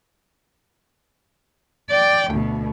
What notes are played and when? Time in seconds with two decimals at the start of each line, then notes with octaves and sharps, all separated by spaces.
1.90 D5 G5
2.30 D2 B2